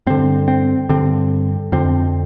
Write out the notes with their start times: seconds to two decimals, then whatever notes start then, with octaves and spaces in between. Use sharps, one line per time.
0.07 G2 D3 C4
0.48 C4
0.89 G2 D3 C4
1.72 F2 D3 C4